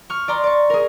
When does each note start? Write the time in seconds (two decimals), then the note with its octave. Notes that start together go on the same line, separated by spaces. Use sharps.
0.10 C#6 F6
0.28 D5 A#5 C6
0.44 D5 C#6
0.70 G#4 A#4